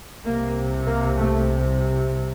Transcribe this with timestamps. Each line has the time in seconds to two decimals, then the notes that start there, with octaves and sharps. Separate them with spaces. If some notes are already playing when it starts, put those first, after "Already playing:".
0.25 C2 C3 A#3
0.87 A#3
1.16 A3